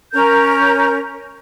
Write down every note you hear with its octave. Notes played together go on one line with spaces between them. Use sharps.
C#4 A#4 A#5 G6